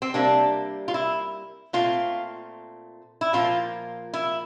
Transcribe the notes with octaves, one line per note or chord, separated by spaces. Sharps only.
C4
C3 G3 A#3 D4
F4
E4
A#2 A3 C4 F4
E4
A#2 F3 A#3 F4
E4